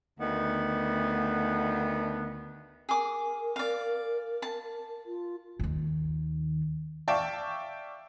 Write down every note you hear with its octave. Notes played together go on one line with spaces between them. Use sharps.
D2 D3 D#3 B3
G#4 A#4 D6
D5 F5
A5
F4
D#2 D#3
D5 E5 F5 G5 A5 C#6